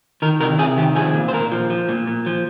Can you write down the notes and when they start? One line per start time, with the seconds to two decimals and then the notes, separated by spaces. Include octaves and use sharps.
0.22 D#3 A#4
0.40 C3 A#4
0.58 C3 G#4
0.77 D#3 G4
0.96 F3 G#4
1.14 A#2
1.28 C5
1.33 A#2 A#4
1.52 F3
1.70 F3
1.89 A#2
2.07 A#2
2.26 F3